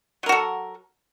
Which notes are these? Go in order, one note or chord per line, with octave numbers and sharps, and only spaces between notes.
F#3 F#4 A4 A#4